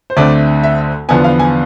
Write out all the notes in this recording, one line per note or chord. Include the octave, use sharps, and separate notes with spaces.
C5
D2 D3 A3 C4 D5
E5
E2 D3 F3 B3 G#5
F5
G#5